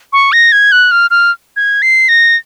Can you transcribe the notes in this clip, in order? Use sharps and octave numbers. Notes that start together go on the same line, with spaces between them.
C#6
A#6
G#6
F#6
F6
F6
G#6
C7
A#6